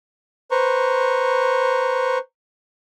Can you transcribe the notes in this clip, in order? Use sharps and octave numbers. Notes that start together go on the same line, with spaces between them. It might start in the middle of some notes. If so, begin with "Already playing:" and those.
B4 C5 A#5 C#6